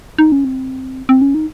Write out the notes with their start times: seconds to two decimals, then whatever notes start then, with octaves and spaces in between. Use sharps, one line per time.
0.18 D#4
0.32 C#4
0.45 C4
1.09 C4
1.22 C#4
1.35 D#4